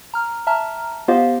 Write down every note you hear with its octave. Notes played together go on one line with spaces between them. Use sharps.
A#5 F6
E5 A5 A#5 F6
B3 F4 G4 C5 D#5 F5